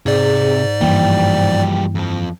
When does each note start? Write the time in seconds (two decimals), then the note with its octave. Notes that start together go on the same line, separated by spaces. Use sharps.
0.06 G#2 C3 G#4 D5
0.81 G2 E3 F3 G3 A#3 G5
1.95 F2 F3